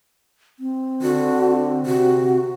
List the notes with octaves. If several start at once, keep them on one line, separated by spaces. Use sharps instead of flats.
C4
D3 F#4
C3 F#4